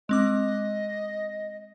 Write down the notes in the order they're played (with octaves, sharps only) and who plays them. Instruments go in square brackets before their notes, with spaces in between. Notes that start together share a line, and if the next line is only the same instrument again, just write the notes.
[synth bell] G#3 C4 D6 [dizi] D#5